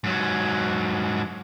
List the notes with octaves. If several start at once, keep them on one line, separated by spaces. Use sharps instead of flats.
G#2 F#3